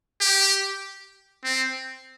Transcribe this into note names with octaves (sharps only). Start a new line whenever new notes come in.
G4
C4